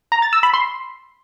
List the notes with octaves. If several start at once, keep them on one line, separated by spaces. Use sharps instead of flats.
A#5
A6
E6
B5
C6